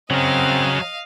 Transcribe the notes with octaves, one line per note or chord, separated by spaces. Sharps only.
C#3 F#3 C4 A#4 D#5 F5